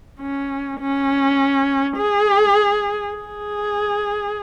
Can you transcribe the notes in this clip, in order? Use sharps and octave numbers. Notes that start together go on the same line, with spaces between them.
C#4
C#4
G#4
G#4